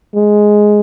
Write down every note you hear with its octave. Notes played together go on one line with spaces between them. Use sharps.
G#3